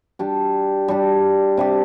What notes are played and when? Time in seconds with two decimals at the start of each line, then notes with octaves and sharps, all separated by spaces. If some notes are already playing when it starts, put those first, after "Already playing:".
0.19 G3 D4 G4
0.88 G3 D4 G4
1.57 C3 G3 D4 G4